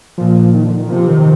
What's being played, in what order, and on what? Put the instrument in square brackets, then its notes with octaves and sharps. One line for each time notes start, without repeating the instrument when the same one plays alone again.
[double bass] A#2 [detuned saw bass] F3
[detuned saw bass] D#3
D3
D#3
[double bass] C3 [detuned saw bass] F3
[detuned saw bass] D#3